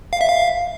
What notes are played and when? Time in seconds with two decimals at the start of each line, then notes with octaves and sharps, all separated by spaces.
0.13 F5
0.21 E5
0.29 F5